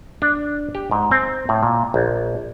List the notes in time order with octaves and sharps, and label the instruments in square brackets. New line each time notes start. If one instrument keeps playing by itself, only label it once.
[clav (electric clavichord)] D4
G4
G#2
C4
A2
A#2
A#1